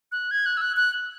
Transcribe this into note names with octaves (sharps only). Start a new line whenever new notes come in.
F#6
G#6
F#6
E6
F#6
F#6